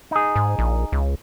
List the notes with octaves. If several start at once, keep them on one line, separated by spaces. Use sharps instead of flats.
D#4 G#4
G#2
A#1
C#2